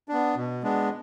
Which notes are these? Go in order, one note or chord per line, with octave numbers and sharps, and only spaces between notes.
B3 D4
B2
G#3 B3 D4